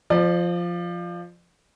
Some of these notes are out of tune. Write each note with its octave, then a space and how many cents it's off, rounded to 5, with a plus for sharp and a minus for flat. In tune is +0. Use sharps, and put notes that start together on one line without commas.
F3 +0 D5 +40